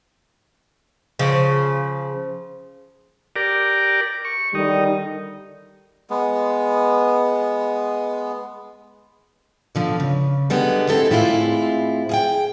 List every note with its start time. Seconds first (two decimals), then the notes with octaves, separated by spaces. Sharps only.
1.19 C#3 F3
3.36 G4 A#4 D5
4.25 C#6
4.55 D3 D#3 G3 D#4
6.10 G#3 B3
9.75 B2 D3 F3
10.00 C#3
10.50 D3 G3 G#3 B3
10.88 G#3 C4 E4 G4 A4
11.11 A2 G#3 B3 C4 E4 F4
12.09 G#4 F5 G5